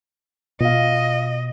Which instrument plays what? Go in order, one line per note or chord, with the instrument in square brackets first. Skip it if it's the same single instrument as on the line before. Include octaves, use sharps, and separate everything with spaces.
[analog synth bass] B2 [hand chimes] F4 F5 [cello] D#5